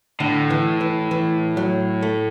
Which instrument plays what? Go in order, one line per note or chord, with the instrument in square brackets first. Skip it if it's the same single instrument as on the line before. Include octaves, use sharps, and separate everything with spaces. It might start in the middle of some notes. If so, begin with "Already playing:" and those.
[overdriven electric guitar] A2 [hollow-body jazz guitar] D3
[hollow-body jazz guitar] E3
E3
E3
F#3
A3